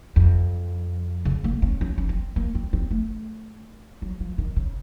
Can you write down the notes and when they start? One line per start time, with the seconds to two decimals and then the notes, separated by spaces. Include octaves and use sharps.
0.16 F2
1.25 C#3
1.44 A#3
1.62 C#4
1.81 C#4
1.98 C#4
2.09 C4
2.36 A#3
2.55 C4
2.73 C4
2.91 A3
4.02 F#3
4.20 F3
4.38 D#3
4.56 C#3